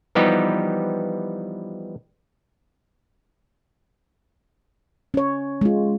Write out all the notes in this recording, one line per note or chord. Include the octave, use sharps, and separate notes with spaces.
E3 F3 G3 B3 D#4 G4
C#4 C#5
G#3 F4